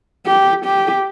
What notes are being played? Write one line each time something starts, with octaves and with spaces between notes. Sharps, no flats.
G4
G4